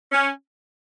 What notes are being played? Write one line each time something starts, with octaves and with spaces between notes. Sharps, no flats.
C#4